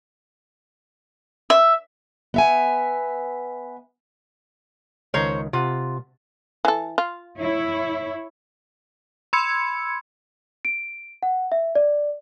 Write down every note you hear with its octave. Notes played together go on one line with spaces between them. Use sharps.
E5
B3 E5 G#5
C#2 D#3 C5 C#5 A#5
C3 F4 F#5
E3 A4
F4
E4 C#5
B5 C6 E6 G#6 C#7
D7
F#5
E5
D5